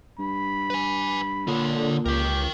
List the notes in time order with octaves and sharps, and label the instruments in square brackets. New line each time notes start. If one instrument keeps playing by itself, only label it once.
[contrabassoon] G2 [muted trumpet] B5
[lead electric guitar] B4 G#5
[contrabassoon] A#2 [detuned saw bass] D3 [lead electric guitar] F4 C#5
[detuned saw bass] C#2 [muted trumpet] G4 [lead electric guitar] A#4 G5